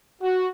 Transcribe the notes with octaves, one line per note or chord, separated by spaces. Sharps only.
F#4